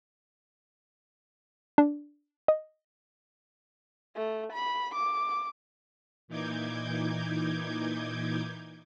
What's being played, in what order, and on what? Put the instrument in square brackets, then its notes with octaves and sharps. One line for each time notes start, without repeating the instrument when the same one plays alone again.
[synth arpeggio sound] D4
D#5
[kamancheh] A3
B5
D6
[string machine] A#2 E3 D#4 D6 G6 G#6